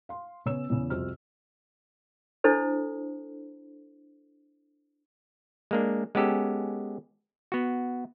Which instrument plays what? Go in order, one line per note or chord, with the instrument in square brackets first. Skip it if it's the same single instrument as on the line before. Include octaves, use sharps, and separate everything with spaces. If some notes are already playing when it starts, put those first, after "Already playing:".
[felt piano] F5 C6
C#3 B3 C#4 C#5 E6 E7
E2 C#3
C2 F2 C3 F#4 C5 F6
[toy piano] D4 E4 A4 C5
[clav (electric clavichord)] G#3 A#3 D4
G#3 B3 C#4 G4 A4
B3 F#4